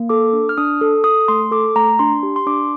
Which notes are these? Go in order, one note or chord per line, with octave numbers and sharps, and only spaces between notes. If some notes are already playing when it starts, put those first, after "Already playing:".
Already playing: A#3
A4 D6
D4
F6
D4 D#6
A4
A4 D#6
A3 C6
A4 D6
A3 A#5
D4 C6
G4
C6
D4 D6